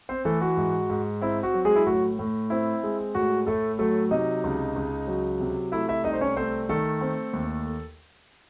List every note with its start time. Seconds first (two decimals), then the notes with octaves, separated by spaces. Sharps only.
0.09 C4 C5
0.25 E3 A3 A4
0.41 F#4
0.57 G#2
0.90 G#2
1.22 C4 E4
1.43 F#4
1.54 F#3
1.65 G#3 G#4
1.76 E4
1.86 A2 F#4
2.19 A2
2.50 C4 E4
2.83 G#3
3.15 A2 F#4
3.47 A2 A3 A4
3.79 F#3 A3 A4
4.11 C3 D#4 D#5
4.44 C#2
4.76 C#2
5.07 F#3
5.40 C3
5.72 A3 E4 E5
5.88 E4 E5
6.04 C2 D#4 D#5
6.13 C5
6.21 C#4 C#5
6.37 A3 C4 C5
6.69 D#3 A3 A4
7.01 C4
7.33 D#2